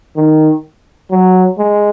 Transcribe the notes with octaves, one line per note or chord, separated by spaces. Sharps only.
D#3
F#3
G#3